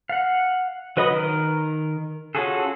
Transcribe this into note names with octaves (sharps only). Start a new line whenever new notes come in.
F5 F#5
F#3 B4 D#5 B5 D#6
D#3 A#4
C#4 F4 F#4 G#4 A4